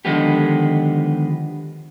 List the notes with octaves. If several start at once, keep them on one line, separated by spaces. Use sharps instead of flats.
D3 D#3 F3 G#3 B3 G4